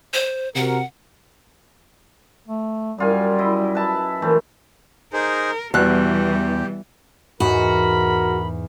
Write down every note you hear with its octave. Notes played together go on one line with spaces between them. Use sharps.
C5
C3 F#4 A#4 F#5
A3
F#2 G3 F4 G#5
E4 D#5
B4 E5 A5
A#2 E3 F3 A3
D#4 G#4 A#4 C5
E2 B2 E3 G3 G4 F#6
E2 G#2 F#4 A#4 B5